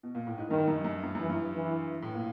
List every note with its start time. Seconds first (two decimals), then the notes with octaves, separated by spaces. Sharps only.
0.03 B2
0.15 A#2
0.27 A2
0.38 G#2
0.50 G2 D#3
0.68 F#2
0.85 F#2
1.03 G2
1.15 F#2
1.21 E3
1.29 G2
1.55 E3
2.02 A2
2.14 A#2